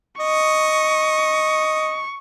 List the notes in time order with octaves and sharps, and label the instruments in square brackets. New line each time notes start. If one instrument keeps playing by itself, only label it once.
[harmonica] D#5 [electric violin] C#6